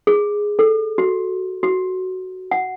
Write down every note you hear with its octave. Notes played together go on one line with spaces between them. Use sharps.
G#4
A4
F#4
F#4
F#5